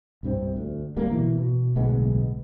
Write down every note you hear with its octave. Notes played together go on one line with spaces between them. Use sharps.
C2 G2 C3 C4
D2
D1 G3 A#3
B2 E3
B2
D1 B1 G#3 B3